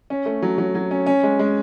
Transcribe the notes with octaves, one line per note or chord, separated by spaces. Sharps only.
C#4
A3
F#3
F#3
F#3
C#4
C#4
G#3
G#3